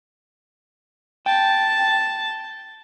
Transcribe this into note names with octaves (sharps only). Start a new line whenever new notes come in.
G5 A5